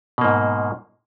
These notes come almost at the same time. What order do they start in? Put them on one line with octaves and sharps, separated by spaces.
B2 A#3 G#2